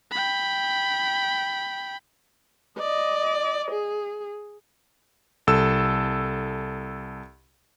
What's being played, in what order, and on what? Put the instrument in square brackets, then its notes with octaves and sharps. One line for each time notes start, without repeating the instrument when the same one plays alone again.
[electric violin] G5 B5
[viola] D5 D#5
G#4
[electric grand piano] C2 A4 E6